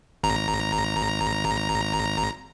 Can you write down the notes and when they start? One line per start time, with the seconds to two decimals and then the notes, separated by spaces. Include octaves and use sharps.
0.24 G#1 A#5